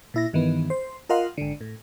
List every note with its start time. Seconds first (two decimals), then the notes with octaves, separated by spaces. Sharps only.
0.14 A#2 E4 A#6
0.33 G2 D#3 E3 B3
0.70 C5
1.09 F4 A#4 D#5 F5 F#5 C6
1.38 G#1 D3
1.61 A2